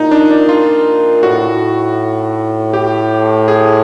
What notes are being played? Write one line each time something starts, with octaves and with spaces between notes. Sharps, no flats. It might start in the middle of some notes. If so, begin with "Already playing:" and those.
Already playing: A#2 D#4
D4
D4
F4
A2 F#4
G4
G#4